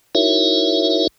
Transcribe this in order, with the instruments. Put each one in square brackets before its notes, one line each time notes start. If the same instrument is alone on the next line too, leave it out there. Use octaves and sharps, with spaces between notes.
[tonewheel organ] D#4 E4 F#4 A#4 C#5 E5